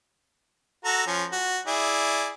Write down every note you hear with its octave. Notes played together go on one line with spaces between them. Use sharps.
F#4 A4 A#5
F3 C#4
F#4
E4 G#4 D5